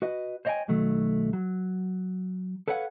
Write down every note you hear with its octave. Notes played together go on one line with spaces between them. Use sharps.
F#4 B4 D#5
C5 C#5 D#5 E5 G5 G#5
B1 D#3 F#3 A3
F#3
A4 B4 C#5 F5 F#5